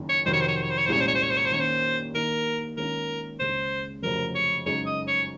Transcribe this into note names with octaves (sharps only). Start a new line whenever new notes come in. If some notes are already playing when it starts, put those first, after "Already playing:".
Already playing: F#1 F#2 D#3
C#5
F2 C3 D#3 F#3 C5
C#5
C5
C#5
C5
C#5
C5
C#5
C5
C2 A#2 G#3 C#4 C#5
C5
C#5
C5
C#5
C5
C#5
C5
D#3 A#3 C#4 C#5
C5
D#3 A#3 D#4 A#4
D#3 G#3 C#4 F4 A#4
C#2 C#3 G#3 C#4 C5
F1 F2 C#3 F#3 A#4
C#5
F#2 C#3 G#3 D#4 C#5
D#5
C#5